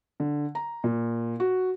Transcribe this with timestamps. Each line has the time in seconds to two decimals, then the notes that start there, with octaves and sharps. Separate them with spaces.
0.20 D3
0.55 A#5
0.84 A#2
1.40 F#4